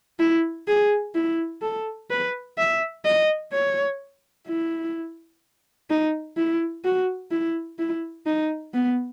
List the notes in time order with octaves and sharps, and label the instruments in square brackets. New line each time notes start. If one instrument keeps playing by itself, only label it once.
[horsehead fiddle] E4
G#4
E4
A4
B4
E5
D#5
C#5
E4
D#4
E4
F#4
E4
E4
D#4
B3